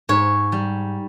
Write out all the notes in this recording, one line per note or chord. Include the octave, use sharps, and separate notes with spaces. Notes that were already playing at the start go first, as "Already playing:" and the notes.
G#2 C#5
G3